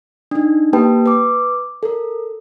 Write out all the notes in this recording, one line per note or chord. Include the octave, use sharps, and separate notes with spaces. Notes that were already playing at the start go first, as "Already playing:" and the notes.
D4 D#4
A#3 G4 B4 G5 A5
B4 D6
A4 A#4